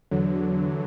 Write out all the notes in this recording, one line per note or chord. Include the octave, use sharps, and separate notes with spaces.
E2 D3 F#3